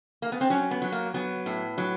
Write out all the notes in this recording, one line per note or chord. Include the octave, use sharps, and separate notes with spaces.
A#3
B3
C4
F#3 C#4
B3
F#3
A#3
F#3 B3
A2
F#3